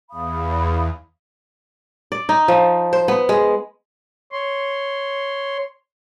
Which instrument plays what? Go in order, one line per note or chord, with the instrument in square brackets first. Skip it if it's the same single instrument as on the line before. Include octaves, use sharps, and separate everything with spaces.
[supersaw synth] E2 [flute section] F5 B5 D#6
[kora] D5
D#4
F3
C5
B3
G#3
[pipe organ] C#5 C6